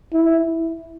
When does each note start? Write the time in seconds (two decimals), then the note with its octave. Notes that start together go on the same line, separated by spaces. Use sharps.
0.13 E4